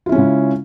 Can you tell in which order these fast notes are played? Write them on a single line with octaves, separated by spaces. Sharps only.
F4 E4 C#4 G#3 C#3